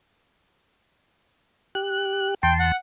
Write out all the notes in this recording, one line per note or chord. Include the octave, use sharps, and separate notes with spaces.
G4 F#6
E2 G5 A5 C6
F#5